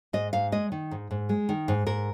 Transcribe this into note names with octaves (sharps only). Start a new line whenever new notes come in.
G#2 D#5
G#2 F5
G#3 D#5
D#3
G#2
G#2
G#3
D#3
G#2
G#2 A#4